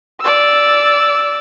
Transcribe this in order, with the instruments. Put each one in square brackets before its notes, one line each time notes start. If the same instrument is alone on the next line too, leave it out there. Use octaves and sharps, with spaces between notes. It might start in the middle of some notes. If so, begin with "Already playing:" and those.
[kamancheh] D5 E6